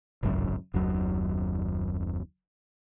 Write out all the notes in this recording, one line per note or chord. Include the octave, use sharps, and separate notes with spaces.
D1 G#1 C#2 F#2
F#1 D#2 F#3